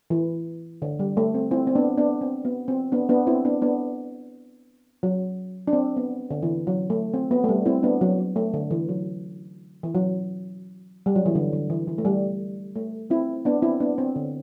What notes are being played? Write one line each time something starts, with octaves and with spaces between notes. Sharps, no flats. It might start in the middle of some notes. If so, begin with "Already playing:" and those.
E3
D3
G3
A3
C4
C4 E4
C4
B3 D4
B3 D4
C4
B3
C4
B3 D4
B3 D4
C4 E4
B3 D4
B3 D4
F#3
D4
C4
B3
D3
E3
F#3
A3
C4
B3
A3
G3
C4 E4
B3 D4
F#3
F#3
A3
D3
E3
F#3
E3
F#3
G3
F#3
E3
D3
D3
E3
E3
A3
G3
A3
C4 E4
B3 D4
C4 E4
B3 D4
C4
D3